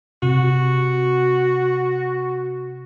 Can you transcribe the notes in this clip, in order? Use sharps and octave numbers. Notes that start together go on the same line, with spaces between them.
C3 F#4